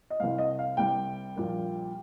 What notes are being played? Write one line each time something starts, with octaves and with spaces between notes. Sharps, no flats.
D#5
C2 C3 G3 F5
D#5
F5
C2 C3 G3 G5
A#1 A#2 G3 A#3